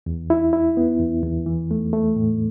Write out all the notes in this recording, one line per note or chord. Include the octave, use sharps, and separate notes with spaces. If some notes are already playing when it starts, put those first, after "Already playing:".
E2
E4
E4
B3
E2
E2
E3
A3
A3
A2